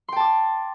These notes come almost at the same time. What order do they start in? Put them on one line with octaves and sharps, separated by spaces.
C6 G5 A5 D6